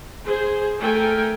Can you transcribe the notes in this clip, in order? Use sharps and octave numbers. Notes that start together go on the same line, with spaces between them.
G#4 C5
A3 A4 A#4 G5 G#5